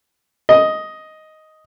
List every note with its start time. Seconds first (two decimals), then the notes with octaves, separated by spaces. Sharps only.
0.49 D#5